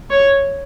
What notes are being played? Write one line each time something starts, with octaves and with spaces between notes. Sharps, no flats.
C#5